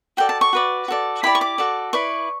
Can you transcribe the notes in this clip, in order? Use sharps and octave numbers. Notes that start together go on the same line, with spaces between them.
F#4 A4 D5 G5
A5
C#6
F#4 B4 D5
F#4 A4 D5
E4 G4 D5 B5
C#6
D6
F#4 A4 D5
E4 B4 D5 C#6